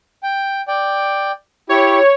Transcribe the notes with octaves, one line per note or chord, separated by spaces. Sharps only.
G5
D5 G5
E4 G4 C#5